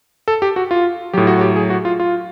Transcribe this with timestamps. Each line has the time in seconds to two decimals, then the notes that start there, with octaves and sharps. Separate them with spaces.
0.28 A4
0.42 G4
0.56 F#4
0.71 F4
1.13 A2 F#3 G4
1.27 F#4
1.41 G4
1.56 G#4
1.70 F#4
1.85 F4
2.00 F4